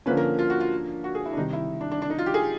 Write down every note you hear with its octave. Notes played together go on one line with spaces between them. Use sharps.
D3 F3 A#3 C#4 B4
A#4
F4
F#4
F4
F#4
G#4
E4
D4
C3 D#3 G3 D#4
E4
D4
D4
D4
D#4
F4
G4
G#4